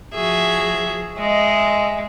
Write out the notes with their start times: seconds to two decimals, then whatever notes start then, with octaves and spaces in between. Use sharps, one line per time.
0.14 F3 F#4 G#4 E5
1.18 G#3 D#5 E5